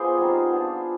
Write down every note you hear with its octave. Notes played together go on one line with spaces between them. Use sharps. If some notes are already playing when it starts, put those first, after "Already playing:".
Already playing: B3 F4 G#4 C5 D5
G3 C4 D#4
B3 D4 F4